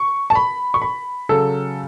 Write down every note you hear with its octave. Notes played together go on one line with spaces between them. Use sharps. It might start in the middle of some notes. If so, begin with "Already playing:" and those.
Already playing: C#6
A5
B5
C#6
B5
C#3 F#3 A4